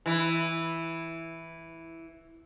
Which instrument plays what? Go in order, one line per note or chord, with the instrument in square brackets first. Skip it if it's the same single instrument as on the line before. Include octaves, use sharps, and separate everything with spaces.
[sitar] E3 E4